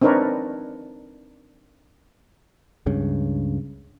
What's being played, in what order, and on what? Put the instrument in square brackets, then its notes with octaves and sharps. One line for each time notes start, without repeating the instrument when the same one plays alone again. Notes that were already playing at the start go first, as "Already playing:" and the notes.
[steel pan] C4 D4 D#4 A#4 B4 C#5
[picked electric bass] C#2 G2 C#3